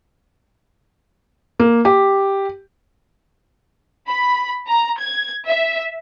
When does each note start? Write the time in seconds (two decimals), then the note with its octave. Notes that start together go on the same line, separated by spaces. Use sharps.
1.59 A#3
1.85 G4
4.08 B5
4.66 A#5
4.99 G#6
5.47 E5